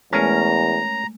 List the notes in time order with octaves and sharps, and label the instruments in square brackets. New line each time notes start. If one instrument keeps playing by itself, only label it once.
[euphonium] E2 [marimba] G#3 A3 [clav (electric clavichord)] C#4 A#4 [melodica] A#5